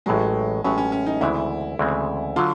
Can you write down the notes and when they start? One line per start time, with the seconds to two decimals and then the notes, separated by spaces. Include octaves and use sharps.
0.06 A1 A2 F#3 G#3
0.64 A1 A2 F#3 C#4
0.78 C#4
0.92 C#4
1.06 D#4
1.21 D2 C#3 E3 G#3 C4 E4
1.79 D2 C#3 E3 G#3 C4
2.36 D3 F#3 F4